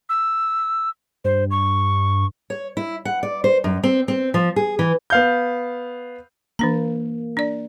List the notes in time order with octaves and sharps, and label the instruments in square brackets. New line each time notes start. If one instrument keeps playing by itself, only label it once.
[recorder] E6
[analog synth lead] G2 [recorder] C5
[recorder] C#6
[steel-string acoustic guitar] C#5
E4
F#5
D5
C5
F#2
C4
C4
F3
G#4
E3
[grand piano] B3 F5 G6
[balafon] E3 D4 A#5 [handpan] A#3
[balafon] D4 D5